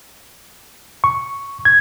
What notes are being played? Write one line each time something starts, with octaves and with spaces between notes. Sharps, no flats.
C#6
G#6